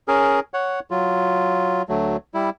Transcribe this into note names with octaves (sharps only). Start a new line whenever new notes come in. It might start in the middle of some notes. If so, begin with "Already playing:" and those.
C#4 G#4 A#4
C#5 F#5
F#3 F4
D2 F#3 A3
G3 E4